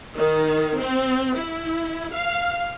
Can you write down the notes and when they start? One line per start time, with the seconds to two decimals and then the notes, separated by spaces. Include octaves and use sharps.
0.16 D#3
0.79 C4
1.36 E4
2.13 F5